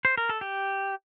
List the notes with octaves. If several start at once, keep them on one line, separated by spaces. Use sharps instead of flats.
C5
A#4
A4
G4